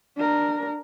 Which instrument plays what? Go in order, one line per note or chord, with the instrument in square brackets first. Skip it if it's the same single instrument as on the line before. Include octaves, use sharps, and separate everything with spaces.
[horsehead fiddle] D4 A#4